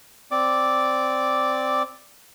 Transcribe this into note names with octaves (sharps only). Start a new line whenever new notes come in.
C4 D5 D6